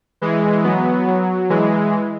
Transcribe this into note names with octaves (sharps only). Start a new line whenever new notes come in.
E3 G#3
F#3 B3
F#3
E3 G#3